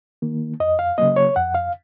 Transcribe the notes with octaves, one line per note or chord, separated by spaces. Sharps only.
D#3 A#3
F2 D#5
F5
C#3 F#3 A#3 D#5
C#5
F2 F#5
F5